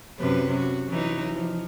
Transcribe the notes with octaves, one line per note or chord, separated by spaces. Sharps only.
F#2 C3 B4
F#4
E3 F#3 D#4
F3